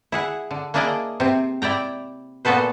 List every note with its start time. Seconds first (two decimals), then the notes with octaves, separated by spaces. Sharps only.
0.12 E4 G#4 F#5
0.51 D3
0.74 A#3 D4 E4 G#4 D5 D#5
1.20 C3 C4
1.62 E4 D5 G5 A#5
2.45 A#2 B3 F#4 A4 B4 C5